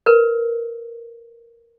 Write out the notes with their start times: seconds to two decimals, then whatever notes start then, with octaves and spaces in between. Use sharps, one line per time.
0.06 A#4 B4